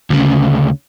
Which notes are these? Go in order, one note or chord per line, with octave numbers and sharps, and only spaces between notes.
D2 C#3